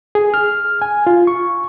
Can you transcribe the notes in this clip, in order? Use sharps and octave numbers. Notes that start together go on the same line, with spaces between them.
G#4
F6
G#5
F4
C#6